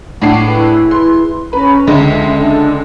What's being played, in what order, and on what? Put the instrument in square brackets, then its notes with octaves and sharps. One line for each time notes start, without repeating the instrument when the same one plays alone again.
[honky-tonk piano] A2 D4 C7 [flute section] F#5 D6
[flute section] E4 G#4 B4
[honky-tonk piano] C6
[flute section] C#4 A#5 B5 [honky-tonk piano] B4
[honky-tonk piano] C#2 D3 G#3 [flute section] D#5 E5
[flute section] D4 A4